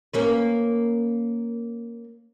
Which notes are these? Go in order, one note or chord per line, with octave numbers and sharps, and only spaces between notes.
A#3 C#4 B4